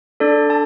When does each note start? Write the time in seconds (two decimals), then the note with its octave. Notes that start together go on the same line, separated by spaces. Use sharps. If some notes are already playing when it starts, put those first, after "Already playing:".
0.20 D4 A4 D5
0.50 A5